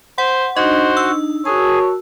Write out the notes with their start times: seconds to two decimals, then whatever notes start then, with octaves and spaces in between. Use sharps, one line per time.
0.18 C5 F#5
0.57 D4 D#4 F#4 C5 D#5
0.97 E6
1.45 F#4 G#4 A#4 C#5 A5